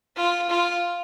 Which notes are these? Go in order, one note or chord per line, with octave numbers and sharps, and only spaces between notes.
F4
F4